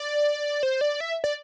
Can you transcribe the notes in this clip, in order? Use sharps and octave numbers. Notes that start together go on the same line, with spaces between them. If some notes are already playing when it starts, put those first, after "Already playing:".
Already playing: D5
C5
D5
E5
D5